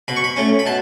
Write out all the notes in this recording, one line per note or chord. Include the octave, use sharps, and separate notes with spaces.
B2 B5
C#6
B5
A3 C#4
B5
B2 A5